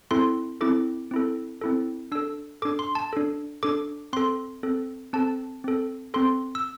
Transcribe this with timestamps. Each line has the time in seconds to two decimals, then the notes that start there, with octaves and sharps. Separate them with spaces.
0.11 C4 E4 A4 C6
0.61 C4 E4 A4 D6
1.11 C4 E4 A4
1.61 C4 E4 A4
2.12 D4 A4 E6
2.62 D4 A4 D6
2.79 C6
2.95 A5
3.13 D4 A4
3.63 D4 A4 D6
4.13 C4 A4 C6
4.63 C4 A4
5.13 C4 A4 A5
5.64 C4 A4
6.14 C4 A4 C6
6.55 E6